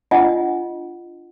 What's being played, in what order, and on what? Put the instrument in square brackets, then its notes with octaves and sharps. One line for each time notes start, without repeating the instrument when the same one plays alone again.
[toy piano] D4 F4 D#5 F#5 G#5